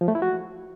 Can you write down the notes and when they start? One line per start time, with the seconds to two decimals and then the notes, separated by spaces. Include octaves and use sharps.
0.01 F3
0.08 A3
0.15 E4
0.22 F#4